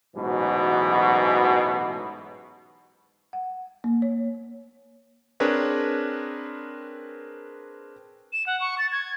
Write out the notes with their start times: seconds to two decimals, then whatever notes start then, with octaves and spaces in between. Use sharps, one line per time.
0.16 A1 G#2 B2 E3 F#3
3.33 F#5
3.84 A#3
4.02 C#5
5.40 C4 D4 G#4 A#4 B4 C#5
8.32 E7
8.47 F#5
8.61 C#6
8.78 A6
8.92 G#6